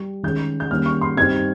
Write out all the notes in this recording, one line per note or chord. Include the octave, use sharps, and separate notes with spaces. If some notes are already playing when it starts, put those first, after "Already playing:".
Already playing: G3
D#3 G#3 C#4 G6
G6
D#3 G3 A#3 C#4 F6
C#6
C6
G2 G3 C4 D#4 G#6